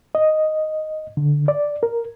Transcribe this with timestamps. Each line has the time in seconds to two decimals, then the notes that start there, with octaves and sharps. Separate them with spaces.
0.15 D#5
1.17 D3
1.48 D5
1.83 A#4